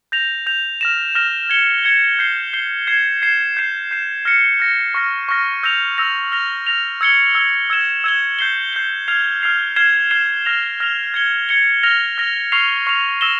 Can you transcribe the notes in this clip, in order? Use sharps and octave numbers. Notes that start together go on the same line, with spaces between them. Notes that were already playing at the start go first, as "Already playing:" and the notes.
G6 A#6 F7
G6 A#6 F7
F6 A#6 E7
F6 A#6 E7
G#6 C#7 G7
G#6 C#7 G7
G6 C7 G7
G6 C7 G7
G#6 C7 E7
G#6 C7 E7
G6 C7 E7
G6 C7 E7
F6 A#6 C#7
F6 A#6 C#7
C#6 F6 A#6
C#6 F6 A#6
E6 G6 A#6 F7
E6 G6 A#6 F7
F6 A#6 F7
F6 A#6 F7
E6 G#6 C#7 G7
E6 G#6 C#7 G7
E6 G#6 E7 G7
E6 G#6 E7 G7
G6 C7 G7
G6 C7 G7
F6 G#6 C7 F7
F6 G#6 C7 F7
F6 G#6 C7 E7 G7
F6 G#6 C7 E7 G7
F6 A#6 F7
F6 A#6 F7
G#6 C#7 G7
G#6 C#7 G7
F6 A#6 F7
F6 A#6 F7
C#6 F6 C7 F7
C#6 F6 C7 F7
E6 A#6 E7 G7